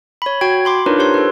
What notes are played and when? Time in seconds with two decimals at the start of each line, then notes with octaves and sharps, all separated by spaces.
0.22 C#5 B5
0.41 F#4 G5 G#6
0.65 B5 C6 D6
0.86 D4 D#4 F4 A#4 B4 C#5
0.99 G4 C5 C#5 C6
1.14 A4 B4